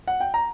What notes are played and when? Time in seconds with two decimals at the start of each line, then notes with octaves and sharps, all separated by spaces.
0.08 F#5
0.21 G5
0.34 A#5